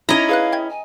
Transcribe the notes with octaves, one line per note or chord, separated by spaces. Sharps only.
C#4 D#4 E4 D#5 A#5
G#4 B4 F5 F#6
G5 G#6
G#5